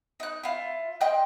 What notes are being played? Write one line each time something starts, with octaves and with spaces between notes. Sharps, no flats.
D#4 F#6
E4 F4
D#5 G5 C6 F#6